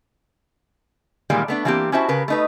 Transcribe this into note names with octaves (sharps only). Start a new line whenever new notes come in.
A#2 D#3 E3 G3 G#3 A#3
A3 B3 D4
E3 G3 A#3 C4 G4
C#4 E4 F#4 C5 E5 A5
C#3 A#4 B4
A3 D#4 B4